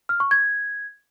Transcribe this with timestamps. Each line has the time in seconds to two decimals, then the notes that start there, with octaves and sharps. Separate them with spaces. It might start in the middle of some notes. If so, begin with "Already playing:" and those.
0.09 F6
0.20 C#6
0.31 G#6